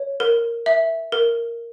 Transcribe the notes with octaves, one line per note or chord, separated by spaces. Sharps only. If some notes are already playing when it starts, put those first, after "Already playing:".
Already playing: C#5
A#4
E5
A#4